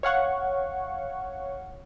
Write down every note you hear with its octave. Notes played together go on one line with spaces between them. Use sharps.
C#5 F5 F#5 C#6